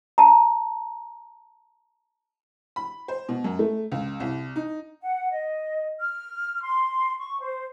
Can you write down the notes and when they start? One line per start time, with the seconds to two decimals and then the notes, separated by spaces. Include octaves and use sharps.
0.18 A5 A#5
2.76 B5
3.08 C5
3.29 B2
3.44 F#2
3.59 A3
3.92 C#2
4.20 C2
4.56 D#4
5.01 F#5
5.31 D#5
6.00 F6
6.63 C6
7.18 C#6
7.42 C5